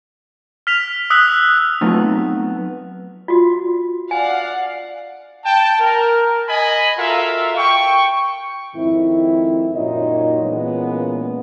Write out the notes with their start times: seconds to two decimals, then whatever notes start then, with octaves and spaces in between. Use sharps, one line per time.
0.67 F6 B6 F7
1.10 D#6 E6 F#6 B6
1.81 F#3 A3 B3 C4 D#4 F4
3.28 F4 F#4
4.11 D5 F5 F#5 G#5
5.44 G5 A5
5.79 A#4
6.49 D#5 G#5 B5
6.97 F4 F#4 A4 A#4 E5 F5
7.57 G5 C#6
8.75 F2 G#2 D#3 C4 E4
9.75 F#2 A#2 F#3 D#4 C#5 D#5
10.44 A#2 E3 G#3 A#3 B3 C#4